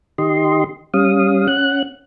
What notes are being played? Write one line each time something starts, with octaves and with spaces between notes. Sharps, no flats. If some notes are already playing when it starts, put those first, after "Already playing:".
D#3 G4 D#5 C6
G3 C#4 F5 D#6
C#4 F#5 F#6